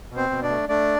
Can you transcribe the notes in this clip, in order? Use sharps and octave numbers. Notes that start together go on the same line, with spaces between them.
B2
C4 C5
B2
D4 D5
A3
A3 D4 D5